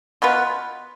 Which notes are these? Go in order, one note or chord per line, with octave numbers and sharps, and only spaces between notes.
B2 B3 F4 B4